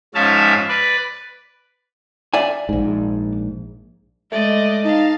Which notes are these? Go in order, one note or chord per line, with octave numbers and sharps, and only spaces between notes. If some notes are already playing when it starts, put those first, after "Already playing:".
G#2 F3 C#4 E5 F5 A5
B4 D5
D5 E5 G#5
A#1 G#2
G#3 A3 D5 D#5
D#4 F5 A5